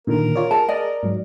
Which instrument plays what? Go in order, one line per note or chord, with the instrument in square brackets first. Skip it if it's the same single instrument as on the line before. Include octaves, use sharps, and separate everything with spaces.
[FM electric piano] A#2 D3 D#3 [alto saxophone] A#4
[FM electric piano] F4 C#5 D5
[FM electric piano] G#4 [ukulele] A5
[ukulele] D5 D#5
[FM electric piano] G#2 F#3